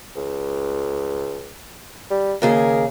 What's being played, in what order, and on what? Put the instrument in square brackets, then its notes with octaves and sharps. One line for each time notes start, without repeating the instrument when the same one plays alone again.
[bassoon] C#2
G3
[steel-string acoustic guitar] D#2 C#3 G#4 [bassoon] A#4